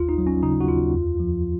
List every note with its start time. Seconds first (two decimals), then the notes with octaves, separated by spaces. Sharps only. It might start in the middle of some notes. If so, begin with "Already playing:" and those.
Already playing: G#1 D#2 F4
0.09 D#4
0.18 F#3
0.27 C#4
0.43 C#3 D#4
0.61 F#4
0.68 D#2 F4
0.94 F2
1.20 F3